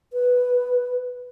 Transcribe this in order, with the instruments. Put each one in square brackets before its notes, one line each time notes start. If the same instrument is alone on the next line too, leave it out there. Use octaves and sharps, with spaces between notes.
[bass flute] B4